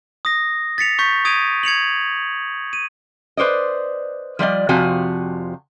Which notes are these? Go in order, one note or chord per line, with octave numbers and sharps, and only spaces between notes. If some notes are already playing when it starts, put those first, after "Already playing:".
D#6 A#6
A6 B6 C#7 F7
C#6 G6 B6
D#6 G#6 D7 D#7 F7
G#6 C#7 F7 F#7
D#7
B4 C5 D5 D#5
F3 G3 D5 D#5
F2 C3 F3 F#4 G#5 A5